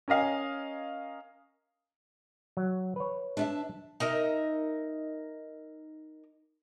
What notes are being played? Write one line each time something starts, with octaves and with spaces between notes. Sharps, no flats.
C#4 A#4 D#5 F5 G#5
F#3
B4 C#5
D4 E5 A5
D#4 A#4 D#5 E5